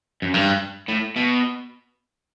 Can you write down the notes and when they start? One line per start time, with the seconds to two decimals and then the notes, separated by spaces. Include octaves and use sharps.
0.22 F#2
0.34 G2
0.89 A2
1.16 B2